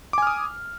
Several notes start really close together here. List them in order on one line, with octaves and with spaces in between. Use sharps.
D6 G#5 F6 D#6